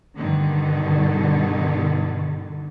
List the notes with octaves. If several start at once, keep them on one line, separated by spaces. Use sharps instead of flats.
G2 B2 D3 D#3